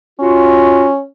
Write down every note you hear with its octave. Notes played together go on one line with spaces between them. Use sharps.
C#4 F4 F#4